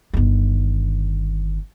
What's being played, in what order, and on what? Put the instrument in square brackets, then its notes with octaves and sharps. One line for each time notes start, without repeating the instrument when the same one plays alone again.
[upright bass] G1 D#3